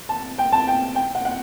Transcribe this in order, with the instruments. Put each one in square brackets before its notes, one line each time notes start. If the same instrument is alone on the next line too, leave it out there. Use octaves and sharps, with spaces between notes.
[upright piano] A5
G5
A5
G5
G5
F#5
F#5